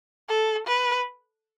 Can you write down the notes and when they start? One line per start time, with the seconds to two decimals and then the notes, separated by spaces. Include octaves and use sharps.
0.29 A4
0.67 B4